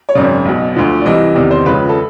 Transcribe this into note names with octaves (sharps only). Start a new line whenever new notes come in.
C#5
G#1 F#2 C#3 D5
B1 B2
D2 D3 F3
D5
C2 C3 E3 D#5
E2 C3 D#3 D5
C5
C#2 C#3 F3 B4
A4